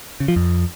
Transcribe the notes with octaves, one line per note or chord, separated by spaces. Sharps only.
C#3
F3
F2